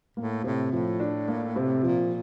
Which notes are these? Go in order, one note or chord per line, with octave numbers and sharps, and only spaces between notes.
A2 A#3
A2 C3
A2 F3
D4
A#3
C3
A#2 F3